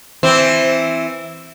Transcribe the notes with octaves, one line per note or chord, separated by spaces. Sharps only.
E3 C4